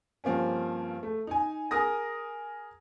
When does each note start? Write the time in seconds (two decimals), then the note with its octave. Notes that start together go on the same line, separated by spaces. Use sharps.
0.24 G2 F3 A#3 C4 C#4
1.03 A3
1.27 D#4 G#5
1.71 G#4 A#4 D#6 A#6